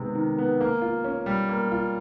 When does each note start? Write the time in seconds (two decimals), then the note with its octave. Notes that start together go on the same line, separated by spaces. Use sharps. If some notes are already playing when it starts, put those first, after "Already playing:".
Already playing: C3 D#3 G#3 B3
0.15 D#3
0.38 B3
0.61 A#3
0.82 F4
1.04 C#4
1.26 G3
1.49 A#3
1.71 F4